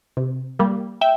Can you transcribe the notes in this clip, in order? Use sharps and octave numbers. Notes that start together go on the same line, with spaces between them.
C3
G3 A#3
E5 G5